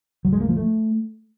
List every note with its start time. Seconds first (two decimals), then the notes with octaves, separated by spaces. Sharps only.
0.25 F#3
0.33 G#3
0.41 A#3
0.49 F3
0.56 A3